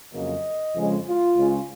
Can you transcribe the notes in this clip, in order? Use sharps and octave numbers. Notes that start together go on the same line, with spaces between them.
F2 C#3 F#3 A#3 D#5
F2 C#3 G#3
F4
C#2 C#3 G#3